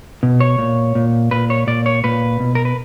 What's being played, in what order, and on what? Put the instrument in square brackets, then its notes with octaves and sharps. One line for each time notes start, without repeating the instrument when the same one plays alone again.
[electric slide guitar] B2
C#5
A#2
A#2
A#2 B4
C#5
A#2 D5
C#5
A#2 B4
B2
A#4
B4